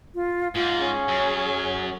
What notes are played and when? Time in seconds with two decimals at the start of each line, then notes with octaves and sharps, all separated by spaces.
0.15 F4
0.55 G#2 F4
0.77 C#4 G#4
1.08 F#2 C#5